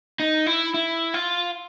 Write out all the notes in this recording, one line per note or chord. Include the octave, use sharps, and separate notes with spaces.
D#4
E4
E4
F4